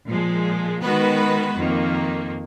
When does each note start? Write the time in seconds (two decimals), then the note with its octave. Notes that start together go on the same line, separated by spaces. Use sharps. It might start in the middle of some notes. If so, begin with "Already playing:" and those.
0.08 A#2 F3 G#3
0.82 D#3 G#3 B3 F#4 B4
1.56 F2 D#3 A#3